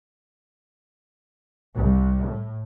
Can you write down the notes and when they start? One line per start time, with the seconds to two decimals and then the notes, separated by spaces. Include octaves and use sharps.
1.75 C2
2.26 A2